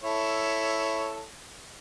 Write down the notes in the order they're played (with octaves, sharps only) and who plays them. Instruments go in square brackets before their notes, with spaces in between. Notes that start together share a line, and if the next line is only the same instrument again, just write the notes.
[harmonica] E4 A4 C#5